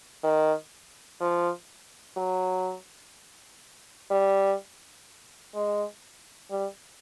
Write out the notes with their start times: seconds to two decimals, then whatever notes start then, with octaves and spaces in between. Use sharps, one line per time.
0.24 D#3
1.20 F3
2.17 F#3
4.10 G3
5.55 G#3
6.51 G3